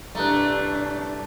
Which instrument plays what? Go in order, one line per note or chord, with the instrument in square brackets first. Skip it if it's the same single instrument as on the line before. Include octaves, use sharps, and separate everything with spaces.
[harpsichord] C2 G2 [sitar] A3 [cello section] D4 [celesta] A#5 F#6